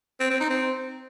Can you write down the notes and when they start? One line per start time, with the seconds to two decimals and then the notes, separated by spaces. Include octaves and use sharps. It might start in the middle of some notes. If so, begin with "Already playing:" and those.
0.20 C4
0.30 C4
0.40 D#4
0.50 C4